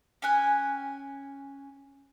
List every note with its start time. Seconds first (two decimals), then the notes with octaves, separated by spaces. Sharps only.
0.22 C#4 G5 G#5 F#6